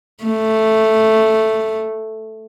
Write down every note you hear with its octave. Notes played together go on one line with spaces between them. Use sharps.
A3